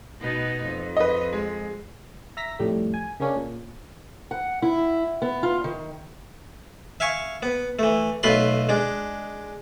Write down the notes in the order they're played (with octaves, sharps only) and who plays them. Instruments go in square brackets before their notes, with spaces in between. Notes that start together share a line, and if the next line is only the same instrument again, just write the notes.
[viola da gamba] B2 B3 D#4
F2
[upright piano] B4 D#5
G#3
[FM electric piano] E5 A#5 A#6 B6
F2 A2 G3 A3
G#5
C#3 A#3 C#4 D4
A#2
[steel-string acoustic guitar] F#5
E4
B3
F4
D#3
[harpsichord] E5 F5 G#5 C#6
B3
E3 A3
B1 A3 F4 B4 B5 C6
G#3 D4